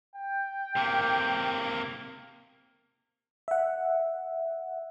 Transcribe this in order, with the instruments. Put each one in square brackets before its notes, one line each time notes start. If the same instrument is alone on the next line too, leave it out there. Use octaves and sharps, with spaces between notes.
[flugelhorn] G5
[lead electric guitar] C3 A#3
[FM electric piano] E5 F#5